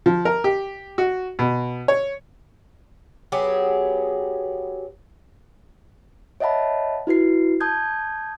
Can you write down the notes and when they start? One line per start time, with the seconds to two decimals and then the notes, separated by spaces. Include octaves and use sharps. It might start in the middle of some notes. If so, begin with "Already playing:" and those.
0.06 F3
0.25 A#4
0.44 G4
0.98 F#4
1.39 B2
1.88 C#5
3.32 F#3 B3 G4 G#4
6.40 C#5 D#5 E5 F#5 A5 B5
7.07 E4 F#4 B4 C7
7.60 A5 D#6 G6 G#6